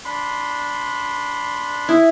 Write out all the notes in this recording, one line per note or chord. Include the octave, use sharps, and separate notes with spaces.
D4 B5 C6
E4 G#4